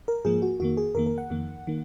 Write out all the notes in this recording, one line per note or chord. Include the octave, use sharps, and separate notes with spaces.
A#4
G#2 F3 A#3 G#4
F#4
F2 D#3 A#3 F#4
G#4
F2 D#3 A#3 A#4
A#4
F#5
F2 D#3 A#3
D#3 A#3